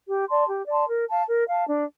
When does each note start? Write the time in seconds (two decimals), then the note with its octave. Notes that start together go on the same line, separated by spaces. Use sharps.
0.08 G4
0.28 D5 A5 C6
0.49 G4
0.68 D5 A5 C6
0.88 A#4
1.08 F5 A5
1.28 A#4
1.48 F5 A5
1.67 D4